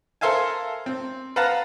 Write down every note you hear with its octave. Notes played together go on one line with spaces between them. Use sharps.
A4 A#4 C5 E5 F5 G#5
C4
B4 F5 F#5 A5 A#5